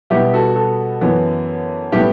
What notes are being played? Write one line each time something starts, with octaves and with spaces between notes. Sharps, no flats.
B2 G3 B3 E4 G4
F#4 A4
F#4 A4
F#2 E3 B3
A2 G3 B3 E4 G4